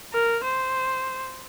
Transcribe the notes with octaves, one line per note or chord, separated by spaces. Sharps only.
A#4
C5